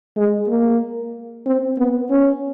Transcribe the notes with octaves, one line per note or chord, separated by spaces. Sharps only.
G#3
A#3
C4
B3
C#4